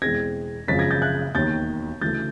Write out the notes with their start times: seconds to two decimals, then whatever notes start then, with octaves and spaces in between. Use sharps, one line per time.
0.02 E2 B2 G#3 C4 G#6 A#6
0.68 G#1 F#2 C#3 F3 G#3 A6 B6
0.79 G#6 A#6
0.91 G6 A6
1.02 F#6 G#6
1.35 E1 D#2 D#3 G6 A6
2.02 D2 C#3 E3 A3 G6 A6